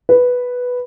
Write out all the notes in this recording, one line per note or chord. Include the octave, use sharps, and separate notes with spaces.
B4